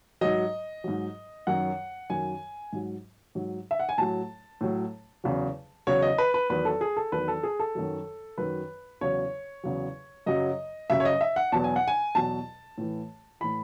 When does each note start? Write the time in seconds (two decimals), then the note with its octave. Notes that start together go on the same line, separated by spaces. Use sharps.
0.21 G#2 F#3 D#5
0.84 G#2 F#3
1.47 F#2 D#3 F#3 F#5
2.10 F#2 D#3 F#3 G#5
2.73 G#2 F#3
3.35 G#2 F#3
3.71 E5
3.80 F#5
3.89 G#5
3.98 A2 F#3 A5
4.61 A2 F#3
5.24 E2 C#3 F#3
5.87 E2 C#3 F#3 C#5
6.02 D#5
6.18 B4
6.34 B4
6.50 E2 D#3 F#3 B4
6.65 A4
6.81 G#4
6.97 A4
7.12 E2 D#3 F#3 B4
7.28 A4
7.43 G#4
7.60 A4
7.75 F#2 D#3 F#3
8.38 F#2 D#3 F#3 B4
9.01 E2 C#3 F#3 C#5
9.64 E2 C#3 F#3
10.26 F#2 C#3 F#3 D#5
10.90 F#2 C#3 F#3 E5
11.00 C#5
11.05 D#5
11.21 E5
11.36 F#5
11.52 E2 B2 F#3 A5
11.64 G#5
11.76 F#5
11.88 G#5
12.15 E2 B2 F#3 A5
12.78 A2 E3
13.41 A2 E3 B5